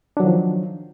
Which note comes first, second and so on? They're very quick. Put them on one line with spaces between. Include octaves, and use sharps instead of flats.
D4 F#3 D#3 F3